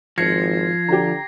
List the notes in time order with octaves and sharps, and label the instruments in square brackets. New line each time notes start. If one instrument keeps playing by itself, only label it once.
[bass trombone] G#1 [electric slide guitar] F3 [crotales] G#6 A#6 C7 [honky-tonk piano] C#7
[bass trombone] D3 [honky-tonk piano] G4 A#5